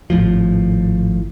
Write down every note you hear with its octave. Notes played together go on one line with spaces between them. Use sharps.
G#1 A2 F3